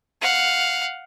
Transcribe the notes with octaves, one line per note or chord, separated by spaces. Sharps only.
F5 F#5